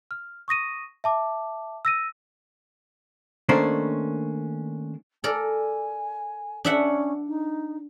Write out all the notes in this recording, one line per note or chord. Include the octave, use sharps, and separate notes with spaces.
F6
C#6 D#6 A#6 D#7
E5 A5 D6
E6 A#6 D#7
D#3 A3 A#3 C#4 D4 C5
A4 A#4 D5 G#5
C#4 D4 E5 F#5
D#4